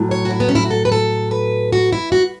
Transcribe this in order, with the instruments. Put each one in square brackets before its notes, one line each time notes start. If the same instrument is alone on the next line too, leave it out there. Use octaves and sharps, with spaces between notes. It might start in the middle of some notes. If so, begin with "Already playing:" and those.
Already playing: [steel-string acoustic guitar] A2 F#3
C#5
F#4
E4
B3
C#4
E4
F#4
A4
B4
A4
B4
F#4
E4
F#4